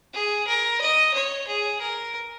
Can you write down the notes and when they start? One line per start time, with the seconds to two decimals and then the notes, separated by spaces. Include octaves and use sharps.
0.13 G#4
0.47 A#4
0.81 D#5
1.14 C#5
1.47 G#4
1.81 A#4